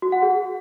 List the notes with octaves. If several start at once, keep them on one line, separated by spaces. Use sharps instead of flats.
F#4
F#5
G#4